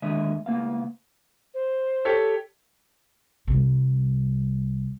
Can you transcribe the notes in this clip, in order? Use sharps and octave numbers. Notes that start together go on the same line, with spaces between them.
D#2 D3 G#3 D#5 E5
C#2 A#3 B3 F5
C5
G4 A4 C#5
C2 G3